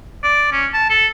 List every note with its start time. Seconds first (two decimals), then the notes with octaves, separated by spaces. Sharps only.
0.24 D5
0.52 C#4
0.74 A5
0.90 A4